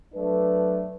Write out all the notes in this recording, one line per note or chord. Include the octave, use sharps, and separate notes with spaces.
F#3 A3 D4 A4 B4